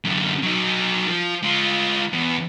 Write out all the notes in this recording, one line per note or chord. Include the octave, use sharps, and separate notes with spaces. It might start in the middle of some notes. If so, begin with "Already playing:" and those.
F#2 D3
F#3 D#4
F3
G#3 F4
E2